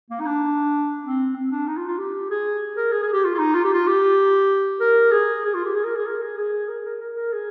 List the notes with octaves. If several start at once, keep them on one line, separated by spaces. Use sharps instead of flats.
A#3
D#4
D4
C4
C4
D4
D#4
F4
F4
G4
G#4
A#4
G#4
G#4
G4
F4
F4
D#4
F4
G4
F4
G4
A#4
G#4
G#4
F4
G4
G#4
A#4
G#4
A#4
G#4
G#4
A#4
A#4
A#4
A#4
G#4